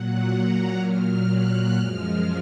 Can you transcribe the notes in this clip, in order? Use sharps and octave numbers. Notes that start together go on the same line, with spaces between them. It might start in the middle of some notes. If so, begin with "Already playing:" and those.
Already playing: A#2 F#3 F#5
A#5
A#2 F#3 F6
F#6
F#2 F3 G#3 F6